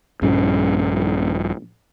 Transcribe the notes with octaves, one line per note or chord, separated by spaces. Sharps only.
A#1 G2 C#4